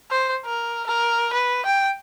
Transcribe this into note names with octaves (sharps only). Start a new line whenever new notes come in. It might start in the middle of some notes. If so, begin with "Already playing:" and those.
C5
A#4
A#4
B4
G5